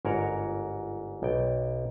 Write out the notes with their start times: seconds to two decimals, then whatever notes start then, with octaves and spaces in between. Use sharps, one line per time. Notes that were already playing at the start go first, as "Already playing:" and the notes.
0.05 G1 G#2 F#4 A#4 C#5 F#5
1.23 B1 G5